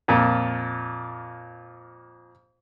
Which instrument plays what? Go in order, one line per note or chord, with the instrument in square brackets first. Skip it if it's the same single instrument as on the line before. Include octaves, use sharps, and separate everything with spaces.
[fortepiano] F2 A#2